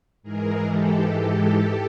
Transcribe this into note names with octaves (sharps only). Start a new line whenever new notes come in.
G#2 E3 G#3 G#4 A#4
G4 A4
G4 A4